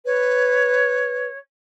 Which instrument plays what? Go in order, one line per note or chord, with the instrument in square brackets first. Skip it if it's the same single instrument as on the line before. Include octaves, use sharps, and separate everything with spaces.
[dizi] B4 [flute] C#5